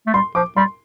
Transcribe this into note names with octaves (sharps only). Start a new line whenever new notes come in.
A3
G3 C6
F3 D6
G3 C6